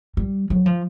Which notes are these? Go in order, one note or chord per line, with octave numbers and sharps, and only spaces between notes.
G3
F#3
F3